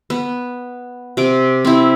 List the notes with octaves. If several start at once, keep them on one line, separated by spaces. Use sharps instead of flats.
B3
C3 D6
C4 E4